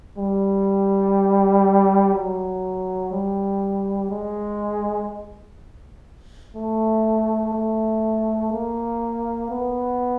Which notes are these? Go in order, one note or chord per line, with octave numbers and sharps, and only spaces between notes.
G3
F#3
G3
G#3
A3
A3
A#3
B3